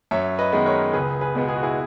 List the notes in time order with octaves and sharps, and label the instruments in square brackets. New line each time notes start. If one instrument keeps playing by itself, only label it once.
[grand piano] F#2 C#5 E5
B4 D#5
D#3 G#3 B3
A#4 C#5
C#2 G#4 B4
G#4 B4
B2 G#3 B3
G#4
F#4
E4 G#4